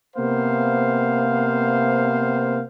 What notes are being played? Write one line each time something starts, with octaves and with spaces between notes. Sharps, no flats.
C3 A#3 B3 C5 F5